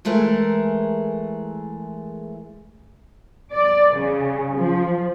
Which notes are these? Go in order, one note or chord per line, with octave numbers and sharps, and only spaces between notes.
E3 G#3 A3 G#4 A#4
D5
C#3
F3